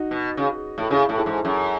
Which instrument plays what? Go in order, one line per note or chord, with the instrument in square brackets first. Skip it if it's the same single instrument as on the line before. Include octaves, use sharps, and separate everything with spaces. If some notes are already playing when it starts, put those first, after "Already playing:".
Already playing: [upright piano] D#4 F#4
[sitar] B2
C#3
[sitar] A2 [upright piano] A4
[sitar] C#3 [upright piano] E4 G#4
[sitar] A2 [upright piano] A4
[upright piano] E4 G#4
[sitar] G#2
F#2